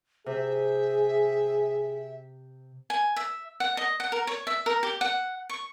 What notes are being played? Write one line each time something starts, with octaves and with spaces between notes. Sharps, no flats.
C3 G#4 E5
G#5
E5
F#5
D#5
F#5
A#4
C#5
E5
A#4
G4
F#5
C#6